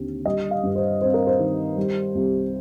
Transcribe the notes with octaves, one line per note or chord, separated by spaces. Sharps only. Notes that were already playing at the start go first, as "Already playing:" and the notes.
Already playing: D#2 D3 C4
G3 D#5
F5
G2
C5
C4 C5
A#4
C5
D#3
G3
C2